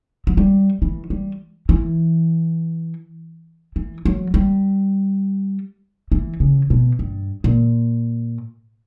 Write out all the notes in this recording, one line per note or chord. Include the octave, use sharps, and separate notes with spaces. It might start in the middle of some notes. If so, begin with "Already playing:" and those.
F#3
G3
E3
G3
E3
E3
F#3
G3
E3
C#3
B2
G2
A#2